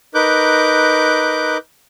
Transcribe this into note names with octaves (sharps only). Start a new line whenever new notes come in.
D#4 A#4 B4 D6 F#6 G6